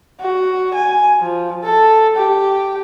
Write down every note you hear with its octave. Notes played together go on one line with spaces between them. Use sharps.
F#4
G#5
F3
A4
G4